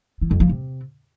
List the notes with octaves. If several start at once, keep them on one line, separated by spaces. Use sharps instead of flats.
E3
F2
F3
C3